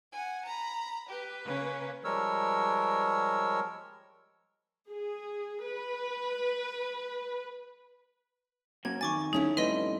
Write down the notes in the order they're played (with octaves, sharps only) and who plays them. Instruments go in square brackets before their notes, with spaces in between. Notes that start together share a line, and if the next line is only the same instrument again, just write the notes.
[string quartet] F#5 G#5
A#5 B5
[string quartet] G4 [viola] B4
[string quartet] C#3 A#3 C#4
[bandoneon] F3 G3 G#3 A#4 C#5 E6
[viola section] G#4
B4
[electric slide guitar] F#3 A#3 C#4 [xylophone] G#6
[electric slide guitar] F2 D#3 G#5 [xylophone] C#6 D6 A6
[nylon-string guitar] A3 C#4 E4 [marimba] D#4
[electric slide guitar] F2 A2 G3 [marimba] B4 [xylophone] D#5 C6 D#7